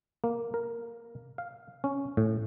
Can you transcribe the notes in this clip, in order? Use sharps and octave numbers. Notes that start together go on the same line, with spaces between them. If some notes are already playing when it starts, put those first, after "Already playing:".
A#3
A#4
F5
C#4
A2